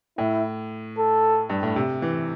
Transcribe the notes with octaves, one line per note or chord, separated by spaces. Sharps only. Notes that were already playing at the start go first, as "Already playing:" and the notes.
A2 E4
A4
G2
A2
C3
E3